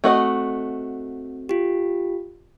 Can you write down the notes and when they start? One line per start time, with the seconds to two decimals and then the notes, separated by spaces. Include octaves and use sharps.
0.04 A3 C4 F#4 D#5
1.49 F4 G4